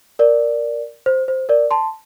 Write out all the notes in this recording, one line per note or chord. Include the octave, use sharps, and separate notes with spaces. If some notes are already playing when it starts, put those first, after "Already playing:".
A#4 D5
C5
C5
A#4 D5
A5 C6